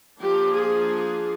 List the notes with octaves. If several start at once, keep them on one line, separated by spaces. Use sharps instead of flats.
F3 A#3 D4 G4
G#4